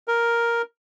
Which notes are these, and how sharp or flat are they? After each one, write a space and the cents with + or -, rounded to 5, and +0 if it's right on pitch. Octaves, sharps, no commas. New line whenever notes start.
A#4 +5